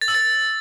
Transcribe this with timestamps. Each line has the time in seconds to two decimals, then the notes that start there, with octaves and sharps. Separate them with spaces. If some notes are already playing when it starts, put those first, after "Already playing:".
0.01 A6
0.08 E6
0.15 A6